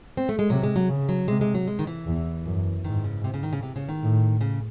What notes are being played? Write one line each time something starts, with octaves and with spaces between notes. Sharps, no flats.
C4
A3
G#3
C3 F#3
G#3
F#3
C#3
F#3
C3 G#3
G#3
F#3
G#3
D#3
E3
E2
F#2
G#2 D#3
C#3
C3
C#3
D#3
C#3
C3
C#3
D#3
A2
C#3